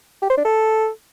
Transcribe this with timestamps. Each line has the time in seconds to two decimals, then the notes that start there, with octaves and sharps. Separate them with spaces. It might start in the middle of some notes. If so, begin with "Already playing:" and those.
0.22 G4
0.30 C5
0.37 D4
0.45 A4